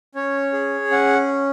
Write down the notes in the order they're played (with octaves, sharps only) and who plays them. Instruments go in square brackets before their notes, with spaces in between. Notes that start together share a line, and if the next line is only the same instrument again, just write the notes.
[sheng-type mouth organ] C#4 C#5
G#4
C#4 F#5